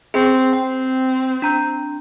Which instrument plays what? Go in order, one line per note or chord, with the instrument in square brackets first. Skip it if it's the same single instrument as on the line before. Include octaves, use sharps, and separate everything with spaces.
[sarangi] C4 [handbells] G#4
[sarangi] C4 [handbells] G5
[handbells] D4 A#5 G6